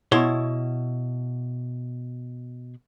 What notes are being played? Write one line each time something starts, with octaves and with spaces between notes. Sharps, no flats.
B2 E4 C#5 C6